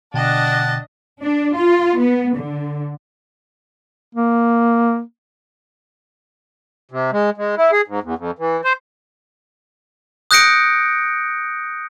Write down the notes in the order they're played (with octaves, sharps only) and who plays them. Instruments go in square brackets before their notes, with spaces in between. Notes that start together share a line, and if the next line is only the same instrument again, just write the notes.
[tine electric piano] B2 D3 G5 [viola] D4 D#5 [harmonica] F#5 A5
[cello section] D4
F4
B3
D3
[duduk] A#3
[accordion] C3
G#3
G#3
E4
G#4
G#2
E2
F2
E3
C5
[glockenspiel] D#6 F#6 G6 A#6 C#7 D7